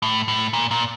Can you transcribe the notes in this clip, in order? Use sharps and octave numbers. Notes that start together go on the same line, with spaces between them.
A2
A2
A#2
A#2